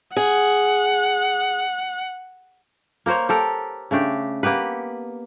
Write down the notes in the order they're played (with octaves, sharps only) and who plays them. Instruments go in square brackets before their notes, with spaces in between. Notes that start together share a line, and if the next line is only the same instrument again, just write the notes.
[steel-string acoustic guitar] G#4 [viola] F#5
[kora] A#3 A#4 C5 C#5
G4 A4 A#4
C#3 A3 D4 G4
A#3 B3 G4 B4